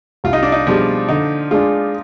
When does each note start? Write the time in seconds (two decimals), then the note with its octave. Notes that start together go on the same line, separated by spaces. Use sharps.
0.24 C2 F4
0.33 D#4
0.43 D4
0.52 D#4
0.67 B2 F3 G3 D4 G#4
1.09 D3 D#4
1.51 G#3 D4 F4 G#4